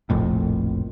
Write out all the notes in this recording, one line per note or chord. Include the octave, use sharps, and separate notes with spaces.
F1 A#1 F2 A2